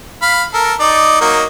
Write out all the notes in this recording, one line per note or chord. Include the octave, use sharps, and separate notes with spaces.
F5 B5
A4 A#4
D#4 D5
F#3 A#3 D#4